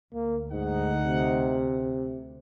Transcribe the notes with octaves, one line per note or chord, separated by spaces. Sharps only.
D2 A#3
G#2 D#4 F#5
C3